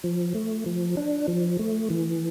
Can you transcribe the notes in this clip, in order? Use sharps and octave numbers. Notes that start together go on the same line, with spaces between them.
F3
A3
F3
D4
F3
A3
E3